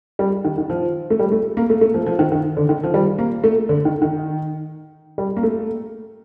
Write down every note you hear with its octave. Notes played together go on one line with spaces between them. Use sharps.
G3
D#3
D#3
F3
A3
G3
A3
A#3
A3
A3
F3
F3
D#3
D#3
D3
D#3
F3
G3
A#3
A3
D3
D#3
D#3
G3
A#3
A3